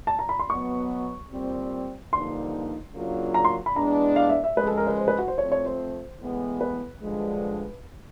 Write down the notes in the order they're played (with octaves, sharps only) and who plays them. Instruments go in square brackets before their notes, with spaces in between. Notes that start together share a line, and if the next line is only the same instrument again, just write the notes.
[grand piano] A5
A#5
B5
C6
[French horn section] B2 F#3 B3 [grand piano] C#6
[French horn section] A#2 G3 C4
[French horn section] G2 D3 F3 A#3 D#4 [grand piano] C6
[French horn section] C#3 F#3 A#3 D4 F4
[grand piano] A#5
C6
B5
[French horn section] E3 G#3 B3 D4 [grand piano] A#5
[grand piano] F5
E5
E5
[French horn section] C#3 F3 G#3 [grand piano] B4
[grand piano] A4
A#4
B4
C5
B4
F#4
C5
[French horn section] F3 A3 C4 [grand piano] C#5
[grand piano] C#5
C5
[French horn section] A2 E3 G#3 B3
[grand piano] B4
[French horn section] G2 D3 F3 G#3